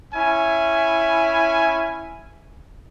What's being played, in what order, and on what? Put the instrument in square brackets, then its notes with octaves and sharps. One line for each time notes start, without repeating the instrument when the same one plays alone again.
[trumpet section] C#4 E4 G#5